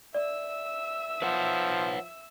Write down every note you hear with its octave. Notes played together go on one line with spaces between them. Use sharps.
D5 E5 E6
F3 B4 C#5 F#5